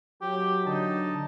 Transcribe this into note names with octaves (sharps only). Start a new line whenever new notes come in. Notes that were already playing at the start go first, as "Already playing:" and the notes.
F#3 G4
D3 D#4 A5